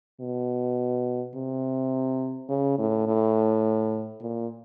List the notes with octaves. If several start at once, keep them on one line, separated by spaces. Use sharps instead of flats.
B2
C3
C#3
A2
A2
A#2